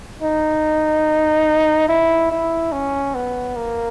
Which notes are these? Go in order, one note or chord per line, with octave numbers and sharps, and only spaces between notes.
D#4
E4
E4
C#4
B3
A#3